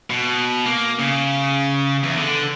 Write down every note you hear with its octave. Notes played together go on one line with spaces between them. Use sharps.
B2
A#3
C#3
E2
D3